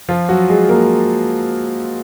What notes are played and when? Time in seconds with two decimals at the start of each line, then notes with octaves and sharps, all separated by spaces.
0.09 F3 F4
0.29 F#3 F#4
0.49 G#3 G#4
0.69 A#3 A#4